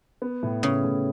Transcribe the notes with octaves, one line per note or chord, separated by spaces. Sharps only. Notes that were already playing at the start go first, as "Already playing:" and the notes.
B3
A2
C#3 B3
A2